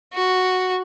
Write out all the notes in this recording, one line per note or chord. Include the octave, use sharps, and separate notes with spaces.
F#4